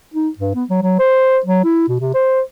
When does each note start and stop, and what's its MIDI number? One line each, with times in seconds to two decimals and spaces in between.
0.14 0.29 63
0.38 0.55 43
0.55 0.64 59
0.70 0.79 54
0.82 0.96 54
0.99 1.38 72
1.46 1.63 54
1.64 1.87 64
1.89 1.97 47
2.01 2.11 48
2.14 2.41 72